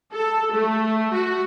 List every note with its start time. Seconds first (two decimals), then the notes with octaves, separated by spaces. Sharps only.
0.13 A4
0.54 A3
1.14 F#4